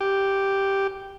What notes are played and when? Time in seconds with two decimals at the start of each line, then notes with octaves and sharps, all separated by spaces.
0.01 G4